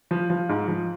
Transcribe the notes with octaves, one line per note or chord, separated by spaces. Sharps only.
F3
F3
G#2
F3